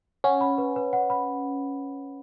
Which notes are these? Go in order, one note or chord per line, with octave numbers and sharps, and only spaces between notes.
C#4 F#5
B5
B4
B4
F#5
B5